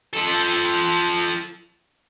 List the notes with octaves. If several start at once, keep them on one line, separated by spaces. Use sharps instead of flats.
F3 A4